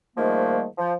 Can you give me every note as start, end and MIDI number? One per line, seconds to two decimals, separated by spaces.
0.16 0.66 44
0.16 0.66 51
0.16 0.66 53
0.16 0.66 55
0.16 0.66 57
0.16 0.66 58
0.77 0.93 53